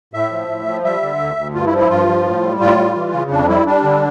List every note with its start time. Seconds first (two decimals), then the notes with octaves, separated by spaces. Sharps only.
0.14 A2 E5
0.31 F3
0.49 A2
0.66 F3
0.84 G3 E5
1.02 D3
1.19 D2
1.37 D2
1.54 G2 F4
1.66 E4
1.72 F3
1.78 E4
1.89 G2 F4
2.07 F3
2.25 A2
2.43 G3
2.60 A2 F4
2.78 G3
2.95 E3
3.12 C#3
3.31 F2 D4
3.48 G3 E4
3.66 G3 D4
3.83 D3